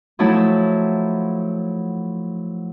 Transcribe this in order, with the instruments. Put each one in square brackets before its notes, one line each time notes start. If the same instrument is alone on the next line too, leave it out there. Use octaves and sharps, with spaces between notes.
[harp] F3 F#3 A3 E4 C#5 A5